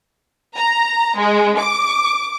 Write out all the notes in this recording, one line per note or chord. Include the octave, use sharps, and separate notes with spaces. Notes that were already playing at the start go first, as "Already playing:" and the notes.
A#5
G#3
D6